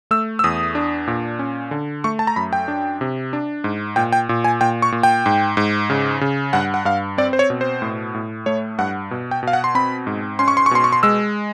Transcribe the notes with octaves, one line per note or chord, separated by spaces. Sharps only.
A3 E6
E6
E2 D#6
D4
A#2
C#4
D3
A3 C#6
A5
A#5
F#2 B5
G5
D4
C3
D4
G#2
A#2 G5
G5
A#2
G#5
A#2 G5
C#6
A#2
G5
G#2
G#2
C#3
C#3
G2 F#5
F#5
G2 F5
C4 D5
C5
C#5
B2
C5
A2
A2
A3 C#5
G2 F#5
B2
G5
B2 F5
F#5
C6
C4 B5
G#2
C#4 C6
C#6
C6
C#6
B2 C6
C#6
C6
G#3 E6